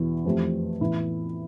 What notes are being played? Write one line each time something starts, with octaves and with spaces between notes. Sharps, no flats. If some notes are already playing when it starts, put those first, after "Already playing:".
Already playing: E2 B2 B3 E4
F2 E3 A3 C4 G4
A2 E3 B3 E4